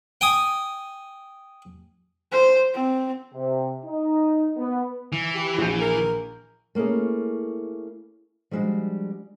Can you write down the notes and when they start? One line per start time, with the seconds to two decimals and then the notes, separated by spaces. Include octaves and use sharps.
0.21 G5 G#5 D#6
2.32 C5
2.74 C4
3.34 C3
3.84 D#4
4.57 B3
5.12 E3
5.35 G4
5.58 A#1 F#4 G6
5.81 A#4
6.75 A3 A#3 C#4 E4 G#4
8.51 F3 G3 G#3 D4 F#4